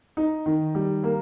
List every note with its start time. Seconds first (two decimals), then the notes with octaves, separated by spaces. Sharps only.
0.17 D#4
0.46 D#3
0.75 G3
1.04 A#3